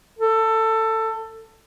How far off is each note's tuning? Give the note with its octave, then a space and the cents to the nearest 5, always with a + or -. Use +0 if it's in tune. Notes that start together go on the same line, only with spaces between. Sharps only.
A4 +20